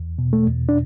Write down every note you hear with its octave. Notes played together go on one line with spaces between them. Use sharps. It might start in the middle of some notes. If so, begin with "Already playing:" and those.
Already playing: E2
B2
A3
E2
D4